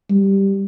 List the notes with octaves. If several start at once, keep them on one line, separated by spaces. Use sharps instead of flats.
G3